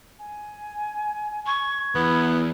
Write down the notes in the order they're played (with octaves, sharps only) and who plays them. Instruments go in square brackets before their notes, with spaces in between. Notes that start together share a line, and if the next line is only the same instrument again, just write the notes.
[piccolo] G#5
[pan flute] C#6 [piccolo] G#6
[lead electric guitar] E2 [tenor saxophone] B3 [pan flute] E4